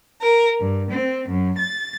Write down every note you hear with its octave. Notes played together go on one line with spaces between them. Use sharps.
A#4
G2
C4
F#2
A6